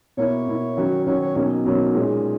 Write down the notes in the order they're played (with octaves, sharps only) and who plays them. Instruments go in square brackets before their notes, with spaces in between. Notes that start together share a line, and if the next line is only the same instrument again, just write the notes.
[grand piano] B2 A#3 E4 [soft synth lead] C#5
[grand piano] B2 A#3 E4
D#3 F#3 C#4 F#4
[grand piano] D#3 F#3 C#4 F#4 [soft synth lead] C#5
[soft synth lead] C#5
[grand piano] B2 F#3 A#3 C#4 [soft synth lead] D#4
[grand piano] B2 F#3 A#3 C#4
A#2 G#3 C#4